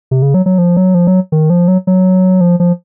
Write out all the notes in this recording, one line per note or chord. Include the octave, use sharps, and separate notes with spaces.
C3
C#3
F#3
F#3
F3
F#3
F3
F#3
D#3
F3
F#3
F#3
F3
F3